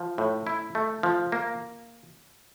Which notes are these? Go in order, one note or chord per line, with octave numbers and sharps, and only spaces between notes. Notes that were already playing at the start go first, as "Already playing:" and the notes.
Already playing: F3
A2
E4
A3
F3
A#3